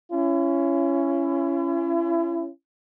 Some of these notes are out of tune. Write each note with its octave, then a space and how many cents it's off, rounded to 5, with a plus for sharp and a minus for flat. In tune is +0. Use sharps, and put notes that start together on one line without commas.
C#4 +0 E4 +40